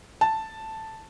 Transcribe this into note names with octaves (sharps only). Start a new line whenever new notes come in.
A5